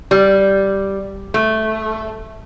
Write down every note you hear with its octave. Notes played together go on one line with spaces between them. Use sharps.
G3
A3